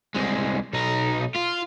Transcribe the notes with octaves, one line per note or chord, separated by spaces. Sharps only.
C2 G#3
B1 D#4
F4